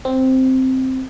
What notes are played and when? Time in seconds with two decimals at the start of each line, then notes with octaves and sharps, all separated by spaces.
0.05 C4